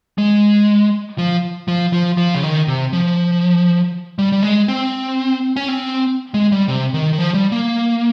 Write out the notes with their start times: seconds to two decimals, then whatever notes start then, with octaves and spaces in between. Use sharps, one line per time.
0.18 G#3
1.18 F3
1.68 F3
1.93 F3
2.17 F3
2.34 C#3
2.43 D#3
2.67 C3
2.93 F3
4.19 G3
4.32 G3
4.43 G#3
4.68 C4
5.56 C#4
5.68 C4
6.34 G#3
6.52 G3
6.68 C3
6.94 D#3
7.13 D#3
7.18 F3
7.34 G3
7.52 A#3